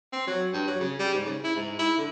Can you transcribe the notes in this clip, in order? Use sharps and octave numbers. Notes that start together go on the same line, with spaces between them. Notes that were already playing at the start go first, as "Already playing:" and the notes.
C4
F#3
G2
F#3
C#3
G3
G#2
C#3
E4
G#2
E4
D3